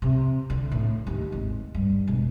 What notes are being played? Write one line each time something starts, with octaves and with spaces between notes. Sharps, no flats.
C3
D3
A2
D#2
G#1
G2
E1